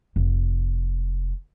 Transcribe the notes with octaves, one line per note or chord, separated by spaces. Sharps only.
F1